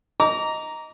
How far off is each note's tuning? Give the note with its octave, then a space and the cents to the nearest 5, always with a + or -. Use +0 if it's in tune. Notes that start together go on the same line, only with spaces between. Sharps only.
D#5 +5 A#5 +0 D6 -30